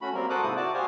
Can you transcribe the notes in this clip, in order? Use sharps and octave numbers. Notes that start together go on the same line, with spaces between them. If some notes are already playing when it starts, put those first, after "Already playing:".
A3 C#4 F#4 B5
F#3 G3 A#3 C4 A#4
F#4 A4 C5 D6 D#6 F#6
G#2 C3 A#3 E4 D#6
F#4 D5 A5 D6
F#4 G4 C5 F5 G#5 D#6